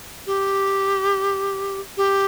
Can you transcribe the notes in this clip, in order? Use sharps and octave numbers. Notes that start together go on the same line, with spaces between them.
G4
G4